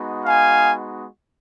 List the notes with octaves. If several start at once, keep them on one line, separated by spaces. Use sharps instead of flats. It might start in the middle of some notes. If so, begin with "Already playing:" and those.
Already playing: G#3 B3 D#4 F#4
F5 G#5